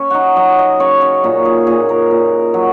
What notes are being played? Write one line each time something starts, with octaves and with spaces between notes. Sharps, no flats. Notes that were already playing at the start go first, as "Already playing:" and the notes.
Already playing: C#4
D#4 F#4
F#3 D#5
D#5
C#3 C#5
C#4
A#2 D#4
G#4
A#2 G#4
A#4
A#2
F#3